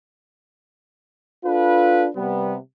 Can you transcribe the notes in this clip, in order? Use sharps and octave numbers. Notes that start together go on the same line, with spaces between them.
D4 F4 A4 B4
C3 G3 B3